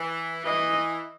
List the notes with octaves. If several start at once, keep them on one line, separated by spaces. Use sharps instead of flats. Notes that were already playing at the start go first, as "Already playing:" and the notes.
Already playing: E3
E3 D#5